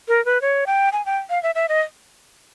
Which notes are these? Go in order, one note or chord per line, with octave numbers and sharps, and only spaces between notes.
A#4
B4
C#5
G5
G#5
G5
F5
E5
E5
D#5